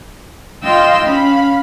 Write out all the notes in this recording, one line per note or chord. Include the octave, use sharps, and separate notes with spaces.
F4 D#5 F5 G5 C6 E6
C#4 F5 B5